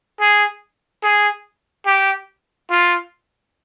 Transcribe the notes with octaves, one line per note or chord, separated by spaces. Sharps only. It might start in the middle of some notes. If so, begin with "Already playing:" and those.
G#4
G#4
G4
F4